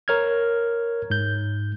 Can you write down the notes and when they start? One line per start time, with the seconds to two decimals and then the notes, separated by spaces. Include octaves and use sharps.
0.08 A#4 C#5 F6 G#6
1.10 G#2 G6